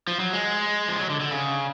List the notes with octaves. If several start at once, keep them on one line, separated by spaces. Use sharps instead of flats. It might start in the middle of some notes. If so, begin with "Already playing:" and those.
F3
F#3
G#3
F3
F#3
D3
D3
C#3